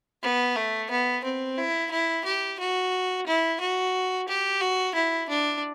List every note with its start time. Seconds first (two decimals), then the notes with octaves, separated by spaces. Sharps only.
0.23 B3
0.56 A3
0.90 B3
1.24 C4
1.58 E4
1.91 E4
2.25 G4
2.59 F#4
3.27 E4
3.60 F#4
4.28 G4
4.61 F#4
4.95 E4
5.29 D4